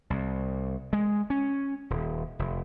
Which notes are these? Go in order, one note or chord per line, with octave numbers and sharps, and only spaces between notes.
C2
G#3
C#4
D#1
F1